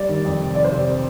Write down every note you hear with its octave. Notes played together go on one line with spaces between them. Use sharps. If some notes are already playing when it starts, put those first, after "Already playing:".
Already playing: G3 D5
D#3
F2
C3
D#3 D5
C5
C3 D5